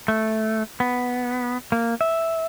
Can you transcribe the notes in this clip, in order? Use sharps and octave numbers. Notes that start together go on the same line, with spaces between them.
A3
B3
A#3
E5